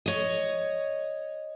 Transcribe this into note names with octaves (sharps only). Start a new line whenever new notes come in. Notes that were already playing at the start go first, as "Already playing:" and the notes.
C#5 D#5